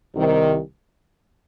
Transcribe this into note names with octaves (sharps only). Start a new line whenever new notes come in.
C2 C3 D#3